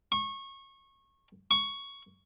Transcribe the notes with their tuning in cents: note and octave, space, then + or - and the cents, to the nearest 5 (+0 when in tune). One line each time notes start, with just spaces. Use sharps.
C#6 -25
C#6 +5